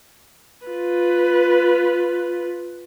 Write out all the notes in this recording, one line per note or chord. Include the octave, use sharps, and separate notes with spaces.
F4 B4